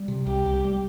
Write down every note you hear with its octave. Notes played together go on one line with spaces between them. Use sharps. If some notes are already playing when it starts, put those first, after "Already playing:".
Already playing: G3
C3
C2 G4
C2
G3